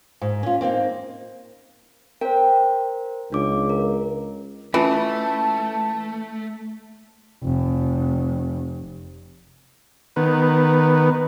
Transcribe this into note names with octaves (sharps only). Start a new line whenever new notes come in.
G#2
C#4 F4
A#3 C4 C#4 D#4
A#4 C5 G5
C#2 D4 D6
A#4
E3 A3 C#4 F4 A5
F1
D#3 B3